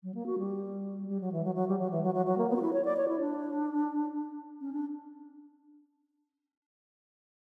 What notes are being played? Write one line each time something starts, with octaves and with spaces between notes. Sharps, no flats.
F#3
A#3
F#4
G3
G3
F#3
E3
F#3
F#3
G3
F#3
E3
F#3
F#3
F#3
A#3
B3
F#4
E4
C#5
D5
C#5
E4
D4
C#4
D4